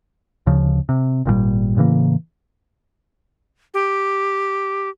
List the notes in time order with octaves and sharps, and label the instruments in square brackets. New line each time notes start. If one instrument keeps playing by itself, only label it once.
[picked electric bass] D2 C#3 F3
C3
G#1 A#2 D3 G3
A2 C#3 E3 A#3
[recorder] G4